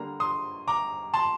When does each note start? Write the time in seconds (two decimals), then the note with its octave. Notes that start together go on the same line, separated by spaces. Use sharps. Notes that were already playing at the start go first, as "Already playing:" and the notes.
Already playing: D3 G3 A#3 A#5
0.20 C6 D#6
0.68 A#5 D6
1.14 A5 C6